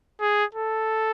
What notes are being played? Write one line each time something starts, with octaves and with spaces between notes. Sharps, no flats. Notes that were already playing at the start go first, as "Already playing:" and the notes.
G#4
A4